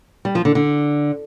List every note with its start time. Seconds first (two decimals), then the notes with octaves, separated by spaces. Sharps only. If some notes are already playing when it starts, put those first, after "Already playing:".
0.25 G3
0.35 F3
0.45 D3
0.55 D3